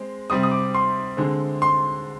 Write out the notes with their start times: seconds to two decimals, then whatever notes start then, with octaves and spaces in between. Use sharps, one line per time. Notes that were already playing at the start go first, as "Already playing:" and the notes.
Already playing: G#3 C4
0.30 C3 G3 C4 D#6
0.43 D#6
0.51 D6
0.75 C6
1.17 D3 G#3 C4
1.62 C6